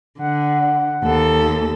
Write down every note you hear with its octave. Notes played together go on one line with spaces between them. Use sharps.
D3 F#5
D#2 A4